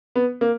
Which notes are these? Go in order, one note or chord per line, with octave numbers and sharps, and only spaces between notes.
B3
A#3